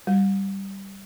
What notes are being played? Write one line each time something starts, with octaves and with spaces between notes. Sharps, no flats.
G3